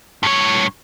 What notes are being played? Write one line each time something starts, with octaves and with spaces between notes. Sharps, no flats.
G2 C#5